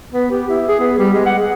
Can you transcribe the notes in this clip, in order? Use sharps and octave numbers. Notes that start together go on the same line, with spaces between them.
B3
G4
E4
G#4
B3
G3
G#3
F#5
G#4